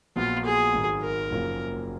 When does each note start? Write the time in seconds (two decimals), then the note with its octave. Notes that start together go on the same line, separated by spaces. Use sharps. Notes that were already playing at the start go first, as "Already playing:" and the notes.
0.16 A#1 A#2 F#3 B3 F4
0.45 G#4
0.74 G#1 G#2 D#3 F#3
1.02 A#4
1.31 F#1 F#2 F3 A#3